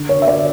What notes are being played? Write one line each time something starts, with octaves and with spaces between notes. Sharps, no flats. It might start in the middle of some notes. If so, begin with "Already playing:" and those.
Already playing: D3
C#5
D3 E5
D5